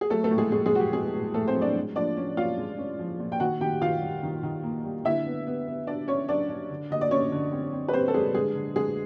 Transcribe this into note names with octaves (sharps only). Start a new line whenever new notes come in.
G#4
F#3 A3 A4
A3 A4
A2
G#3 G#4
A2 G#3 G#4
G#3 G#4
F#3 F#4
G4
G#3 B3 G#4
A2
A2 A3 A4
C4 C5
F#3
D4 D5
G#3
F3 D4 D5
C#4
C#4 F4 F5
G#3
C#4
F3
A#2
G5
D#3 F#4 F#5
D#3 G4 G5
D#3 F4 F5
G3
D#3
D#3
A#3
G3
D3 E4 E5
B3
B3
B3
D4 D5
C#4 D4 C#5
F#3 D4 D5
D4
D3
D3 D#5
D5
D3 C#4 C#5
D3
C4
C4
B4
G3 C4 C5
A4
G3 G#3 G#4
D3 G#3 G#4
D3
D3 G#3 G#4